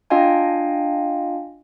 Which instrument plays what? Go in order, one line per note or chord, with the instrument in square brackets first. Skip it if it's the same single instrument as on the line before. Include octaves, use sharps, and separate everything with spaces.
[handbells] D4 F4 D#5 F5 G5 G#5